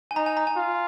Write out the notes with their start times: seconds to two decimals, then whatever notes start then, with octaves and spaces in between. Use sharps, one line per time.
0.11 G#5
0.16 D#4 A#5
0.26 G#5
0.37 A#5
0.47 G#5
0.57 F4